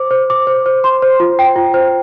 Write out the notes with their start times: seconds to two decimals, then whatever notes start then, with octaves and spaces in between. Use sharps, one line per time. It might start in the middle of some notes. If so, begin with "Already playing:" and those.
Already playing: C5 D6
0.11 C5
0.30 D6
0.47 C5
0.66 C5
0.84 C6
1.02 C5
1.20 F4
1.39 G5
1.56 F4
1.74 C5